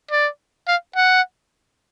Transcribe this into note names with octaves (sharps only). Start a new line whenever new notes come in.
D5
F5
F#5